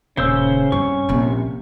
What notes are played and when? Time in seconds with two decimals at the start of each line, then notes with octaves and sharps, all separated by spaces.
0.17 D#1 C#3 C#4 C5 E6
0.72 G2 C3 C#6
1.09 A#1 C3